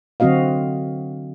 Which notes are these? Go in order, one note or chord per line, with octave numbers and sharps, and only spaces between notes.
D3 F#3 C4 F#4 D#5 F5